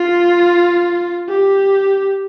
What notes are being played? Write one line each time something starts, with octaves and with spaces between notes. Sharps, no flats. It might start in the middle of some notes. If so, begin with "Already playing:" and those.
Already playing: F4
G4